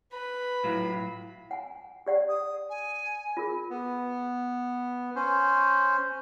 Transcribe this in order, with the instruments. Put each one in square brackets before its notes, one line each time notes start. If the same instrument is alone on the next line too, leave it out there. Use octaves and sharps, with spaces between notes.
[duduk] B4 [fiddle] B5
[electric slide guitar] A2 F#3 F4 [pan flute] E4
[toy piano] F#5 G#5
G4 D5 F#5
[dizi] D#6
G#5
[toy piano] F4 G#4 A#4
[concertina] B3
C#4 C5